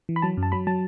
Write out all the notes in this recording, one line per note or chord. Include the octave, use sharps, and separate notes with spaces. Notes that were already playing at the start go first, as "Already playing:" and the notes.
E3
B5
F#3 A5
F#2
A5
F#3 B5
F#3 A5